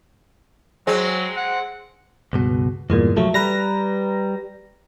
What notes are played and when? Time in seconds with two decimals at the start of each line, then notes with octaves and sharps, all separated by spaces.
0.87 F#3 G#3 C4
1.37 F#5
2.33 C#2 G2 B2
2.90 E2 G2 A#2 G#3
3.17 C2 F3 F#3 A3
3.34 G3 B4 A#5 A#6